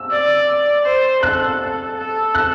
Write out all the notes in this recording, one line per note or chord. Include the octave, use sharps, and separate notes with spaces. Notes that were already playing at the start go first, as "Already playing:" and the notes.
Already playing: E6
D5
C5
A4 F#6
A4
F#6